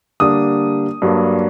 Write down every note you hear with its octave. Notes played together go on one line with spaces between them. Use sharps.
D3 G3 A#3 D4 D#6
G2 F#3 A#3 D4